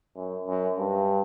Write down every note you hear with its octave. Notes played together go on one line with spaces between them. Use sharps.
F#2
F#2
G2